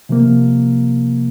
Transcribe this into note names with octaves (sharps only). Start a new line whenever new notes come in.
C3 F3 A#3